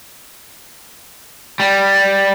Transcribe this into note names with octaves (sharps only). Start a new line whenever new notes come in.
G3